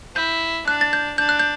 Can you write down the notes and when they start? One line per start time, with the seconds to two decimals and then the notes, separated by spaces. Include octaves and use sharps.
0.16 E4 G6
0.67 D4 F#6
0.81 A6
0.93 G6
1.18 D4 G6
1.29 F#6
1.39 G6